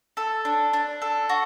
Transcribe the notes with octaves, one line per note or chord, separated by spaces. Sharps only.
A4
D4
D4
A4
F#4